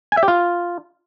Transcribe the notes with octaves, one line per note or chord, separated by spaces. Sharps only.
G#5
E5
G4
F4